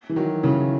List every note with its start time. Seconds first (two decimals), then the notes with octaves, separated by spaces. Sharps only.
0.09 E3
0.16 D#3 F#3
0.43 C#3 E3